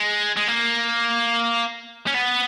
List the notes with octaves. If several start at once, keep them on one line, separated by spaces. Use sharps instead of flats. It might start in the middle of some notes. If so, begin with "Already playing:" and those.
Already playing: G#3
G#3
A#3
C#4
B3